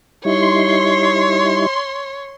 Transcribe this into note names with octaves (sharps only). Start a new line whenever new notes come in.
G3 D#4 E4 C#5 C6